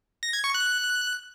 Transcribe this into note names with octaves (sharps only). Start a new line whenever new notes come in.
A#6
G#6
C#6
F#6